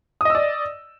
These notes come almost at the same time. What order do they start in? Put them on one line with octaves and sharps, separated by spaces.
D#6 D#5 E6 D5